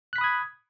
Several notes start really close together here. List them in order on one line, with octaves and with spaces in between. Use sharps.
F#6 B6 B5 D#6 G#6